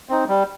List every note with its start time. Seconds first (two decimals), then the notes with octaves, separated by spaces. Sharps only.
0.09 C4 D#4
0.28 G3